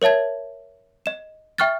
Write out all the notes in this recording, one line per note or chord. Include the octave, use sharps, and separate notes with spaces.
A#4 C#5 E5 A5 G#6
D#5 E7
E5 G5 C#6 F6 F#6 A6